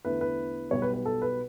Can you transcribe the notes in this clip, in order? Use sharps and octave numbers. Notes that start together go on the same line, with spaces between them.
E2 D3 A3 E4 B4
B4
B1 B2 G3 C#5
B4
B4
A4
B4